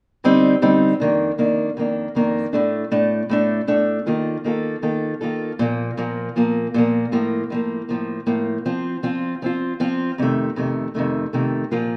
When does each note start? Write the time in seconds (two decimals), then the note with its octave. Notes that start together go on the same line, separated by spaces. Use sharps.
0.24 D3 G3 C4 D#4
0.62 D3 G3 C4 D#4
1.00 F2 D#3 A#3 D4
1.38 F2 D#3 A#3 D4
1.77 F2 D#3 A#3 D4
2.15 F2 D#3 A#3 D4
2.53 A2 A3 D4
2.92 A2 A3 D4
3.29 A2 A3 D4
3.67 A2 A3 D4
4.06 D#3 A#3 F4 A4
4.44 D#3 A#3 F4 A4
4.83 D#3 A#3 F4 A4
5.21 D#3 A#3 F4 A4
5.59 A#2 F3 A#3
5.97 A#2 F3 A#3
6.36 A#2 F3 A#3
6.74 A#2 F3 A#3
7.12 A2 F3 A#3
7.50 A2 F3 A#3
7.89 A2 F3 A#3
8.27 A2 F3 A#3
8.66 F3 C4 F4
9.03 F3 C4 F4
9.42 F3 C4 F4
9.80 F3 C4 F4
10.18 F2 C3 D#3 A3
10.56 F2 C3 D#3 A3
10.95 F2 C3 D#3 A3
11.33 F2 C3 D#3 A3
11.71 A#2 F3 A#3 F4